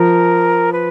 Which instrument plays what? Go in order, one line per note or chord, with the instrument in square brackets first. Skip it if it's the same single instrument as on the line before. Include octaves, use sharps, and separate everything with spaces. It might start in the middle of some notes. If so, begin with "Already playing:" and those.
Already playing: [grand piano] F3 [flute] A#4
[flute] B4